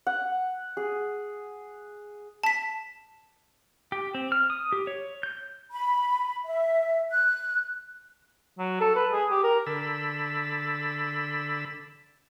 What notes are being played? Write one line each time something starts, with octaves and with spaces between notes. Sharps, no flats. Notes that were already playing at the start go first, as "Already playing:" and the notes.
F#5
G#4
A5 B6
G4
C4
F6
D#6
G4
C#5
G6
B5
E5
F#6
F#3
A4
B4
G#4
G4
A#4
D3 A4 B5 E6